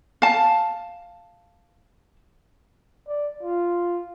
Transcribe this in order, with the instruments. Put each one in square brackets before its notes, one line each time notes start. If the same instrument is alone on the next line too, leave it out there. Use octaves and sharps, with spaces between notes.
[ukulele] F5 A5
[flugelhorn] D5
F4